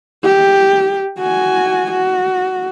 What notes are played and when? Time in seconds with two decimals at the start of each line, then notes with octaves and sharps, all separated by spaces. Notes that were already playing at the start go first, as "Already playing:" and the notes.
0.24 G4
1.19 F#4 G#5
1.91 F#4